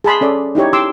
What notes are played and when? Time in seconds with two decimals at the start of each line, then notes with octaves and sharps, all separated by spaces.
0.04 G#4 A5 B5 C6
0.21 C#4 A4 D5
0.55 D#4 E4 G4 C#5
0.73 G4 C6 D6 E6